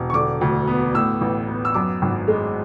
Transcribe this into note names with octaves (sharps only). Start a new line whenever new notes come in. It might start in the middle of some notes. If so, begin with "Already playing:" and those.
Already playing: E1
C#6
D3 D6
D2
B3
A2 E6
A1
B3
E6
F#2 D6
G#1
G#3